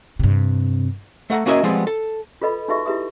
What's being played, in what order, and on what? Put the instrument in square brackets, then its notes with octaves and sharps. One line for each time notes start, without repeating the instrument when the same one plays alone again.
[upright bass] G2 C3
[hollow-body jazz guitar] A3 A4 F#5 A#5
A#3 C#4 F#4 A#4 D#5 E5
F3 G3 G#3 B3 C4
A4
[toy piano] F4 A4 B4 D#5 B5
D#4 F#4 B4 D#5 E5 C#6
E4 G4 B4 E5 D#6